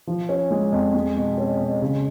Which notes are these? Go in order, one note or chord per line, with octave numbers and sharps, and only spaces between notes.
F3
C#4
G#3
F2
G#3
B2
C#4
B2
C#3